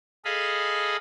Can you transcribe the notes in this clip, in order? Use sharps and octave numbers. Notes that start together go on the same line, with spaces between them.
G#4 A4 D#5 F5 B5